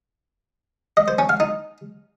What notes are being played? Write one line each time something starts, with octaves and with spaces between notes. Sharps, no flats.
D#5
C5
C#4
F5
D#4